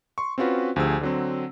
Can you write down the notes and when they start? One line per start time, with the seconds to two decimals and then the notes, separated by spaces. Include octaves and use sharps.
0.18 C6 C#6
0.38 C4 C#4 F4 F#4 B4
0.76 D2 F3 G4 G#4 E6
1.01 D3 F#3 C4